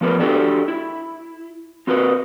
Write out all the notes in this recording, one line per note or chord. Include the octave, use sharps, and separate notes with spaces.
F3 B3 A#4 B4
D4 F#4 G4 A4 D5
E4
C4 F#4 A#4 B4